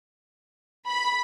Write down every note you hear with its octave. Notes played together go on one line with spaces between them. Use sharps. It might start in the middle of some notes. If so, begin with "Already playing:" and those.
B5